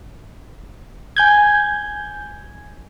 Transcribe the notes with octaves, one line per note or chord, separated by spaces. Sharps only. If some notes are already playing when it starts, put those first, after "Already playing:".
G#5 G6 G#6